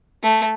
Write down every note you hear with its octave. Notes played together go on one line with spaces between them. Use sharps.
A3